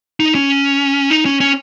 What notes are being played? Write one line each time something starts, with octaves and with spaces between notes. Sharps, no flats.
D#4
C#4
D#4
C#4
C#4